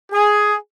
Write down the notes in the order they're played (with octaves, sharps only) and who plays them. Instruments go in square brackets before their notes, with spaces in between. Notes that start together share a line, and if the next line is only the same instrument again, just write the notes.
[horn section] G#4